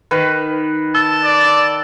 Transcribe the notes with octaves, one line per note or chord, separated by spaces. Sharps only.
D#3 B4
A5 E6
D5